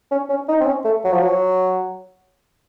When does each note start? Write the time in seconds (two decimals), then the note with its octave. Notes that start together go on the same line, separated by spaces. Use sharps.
0.11 C#4
0.29 C#4
0.48 D#4
0.61 C4
0.66 C#4
0.85 A3
1.04 F#3
1.12 F3
1.22 F#3